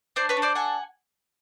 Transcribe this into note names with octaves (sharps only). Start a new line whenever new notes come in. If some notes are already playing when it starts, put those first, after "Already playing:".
D4 C5 D5
B4 C#5
D4
C5 D5
A4 F#5 G#5